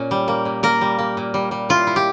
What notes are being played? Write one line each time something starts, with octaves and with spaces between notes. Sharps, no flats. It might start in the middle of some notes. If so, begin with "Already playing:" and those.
Already playing: A#2 C#4
G3
A#3
A#2
A#3 A#4
G3
A#3
A#2
G3
G3
E4 F4
E4
G4